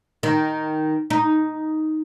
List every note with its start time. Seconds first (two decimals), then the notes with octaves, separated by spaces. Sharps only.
0.23 D#3
1.10 D#4